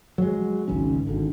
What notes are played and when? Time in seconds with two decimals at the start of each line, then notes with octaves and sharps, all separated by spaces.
0.18 F#3 G#3
0.68 G#1 C#2 C#4
1.07 G#1 D3